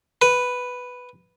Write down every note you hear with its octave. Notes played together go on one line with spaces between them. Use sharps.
B4